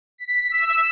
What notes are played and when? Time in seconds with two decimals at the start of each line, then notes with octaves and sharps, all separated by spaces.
0.18 B6
0.51 E6